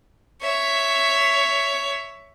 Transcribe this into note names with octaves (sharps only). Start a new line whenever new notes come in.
C#5 E5